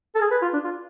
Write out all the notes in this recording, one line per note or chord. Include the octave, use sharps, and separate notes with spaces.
A4
G#4
B4
F4
D4
F4